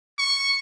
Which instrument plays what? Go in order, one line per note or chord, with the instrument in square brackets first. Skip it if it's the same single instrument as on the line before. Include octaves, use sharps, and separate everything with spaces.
[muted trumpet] C#6